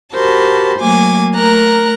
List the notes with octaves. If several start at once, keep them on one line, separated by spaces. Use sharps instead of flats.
F#4 G4 A#4 C5 A5 B5
F#3 A3 A#3 G#5 D6
A3 A#4 A#5 F#6